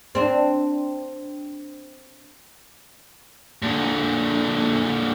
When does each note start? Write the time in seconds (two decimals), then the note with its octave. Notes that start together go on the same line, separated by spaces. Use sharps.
0.15 C4 D4
3.62 A#2 D3